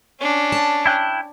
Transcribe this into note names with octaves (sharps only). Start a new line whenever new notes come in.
C#4 D4
A5
E4 G5 F#6